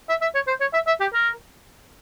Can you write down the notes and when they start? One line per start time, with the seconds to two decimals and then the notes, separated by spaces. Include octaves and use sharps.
0.09 E5
0.21 E5
0.35 C#5
0.47 C5
0.61 C#5
0.73 E5
0.87 E5
1.00 G4
1.14 A#4